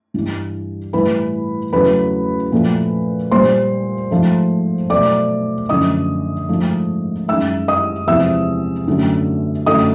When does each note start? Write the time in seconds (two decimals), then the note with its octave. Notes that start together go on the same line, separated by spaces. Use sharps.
0.14 G2 E3 G3
0.93 A2 E3 G3 B4 B5
1.73 E2 C#3 F#3 A3 B4 B5
2.52 A#2 F3 A3
3.31 A#2 G3 C5 C6
4.11 G#2 F3 A3
4.90 B2 F#3 A3 D5 D6
5.69 F#2 D3 F3 A3 D#5 D#6
6.49 G#2 F3 A3
7.28 F#2 D#3 G#3 E5 E6
7.68 D#5 D#6
8.07 E2 C3 F3 G#3 E5 E6
8.87 F#2 D3 F#3 A3
9.66 F#2 D3 F#3 A3 D#5 D#6